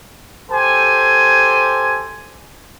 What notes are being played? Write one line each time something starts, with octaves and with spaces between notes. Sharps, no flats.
G4 A4 C5 G#5